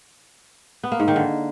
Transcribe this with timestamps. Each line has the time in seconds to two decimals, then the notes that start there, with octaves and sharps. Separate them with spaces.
0.83 B3
0.92 A#3
1.00 G#2
1.08 D#3
1.16 D3